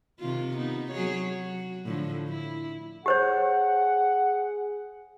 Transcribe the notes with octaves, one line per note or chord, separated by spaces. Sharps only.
C3 D#3 F4
B3 D#4
F#3 G#4 C#5
F#4
A2 D3 F3
E4
G4 G#4 C5 C#5 F#5